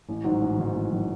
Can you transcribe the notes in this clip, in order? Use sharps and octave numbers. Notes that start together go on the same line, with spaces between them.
A1
G#2 D#3 F#3
A1
G#2 D#3 F#3
A1
D#3 F#3